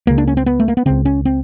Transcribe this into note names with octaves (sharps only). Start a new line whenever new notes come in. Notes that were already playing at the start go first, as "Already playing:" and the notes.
C#2 C#3 A#3
D4
C#4
C4
B3
A3
A#3
B3
C#2 C#3 C4
C#4
C4